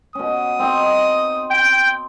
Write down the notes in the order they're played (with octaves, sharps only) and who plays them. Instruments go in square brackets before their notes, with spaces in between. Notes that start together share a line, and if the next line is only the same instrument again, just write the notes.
[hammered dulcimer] B2 C#4 [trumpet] D#6
[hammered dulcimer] C4 D#4 D#5
[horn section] G5